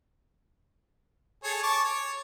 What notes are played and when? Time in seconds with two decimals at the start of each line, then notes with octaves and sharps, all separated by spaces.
1.44 G#4 A4 C#5
1.63 A5 C#6 D6
1.85 C#5